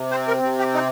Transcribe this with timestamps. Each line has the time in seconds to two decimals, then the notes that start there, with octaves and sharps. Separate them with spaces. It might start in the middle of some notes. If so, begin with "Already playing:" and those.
Already playing: C3
0.11 C4 C5
0.27 A#4
0.43 C3
0.59 G4
0.74 D#4